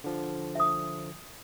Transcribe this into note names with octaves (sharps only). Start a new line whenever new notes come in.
D3 F3
E5 D#6